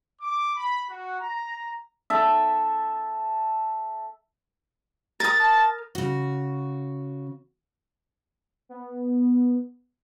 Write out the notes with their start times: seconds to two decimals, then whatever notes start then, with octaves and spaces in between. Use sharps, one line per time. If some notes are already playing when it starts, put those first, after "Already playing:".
0.21 D6
0.56 B5
0.88 F#4
1.20 A#5
2.10 A4 E5
5.20 A#4 D#6 A6
5.39 A5
5.95 C#3 F#4
8.69 B3